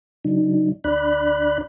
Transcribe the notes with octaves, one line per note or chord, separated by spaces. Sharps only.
C#3 F#3 D4 D#4
D2 D4 D5 B5 F#6